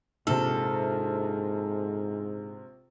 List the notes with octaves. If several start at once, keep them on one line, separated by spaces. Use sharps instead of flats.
A#1 G#2 C3 A4